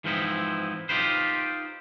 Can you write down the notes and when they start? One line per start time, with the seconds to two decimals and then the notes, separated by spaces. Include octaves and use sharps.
0.04 G#2 E3 F3 C4 D#4 E4
0.89 D#4 F4 G4 B4 C5